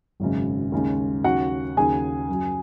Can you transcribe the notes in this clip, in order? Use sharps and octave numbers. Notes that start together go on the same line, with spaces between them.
G#1 F#2 C#3 G#3
D#2 C#3 G#3
D#2 C#3 F#3 F#4 F#5
D#2 C#3 F#3 G#4 G#5
F#2 C#3 F#3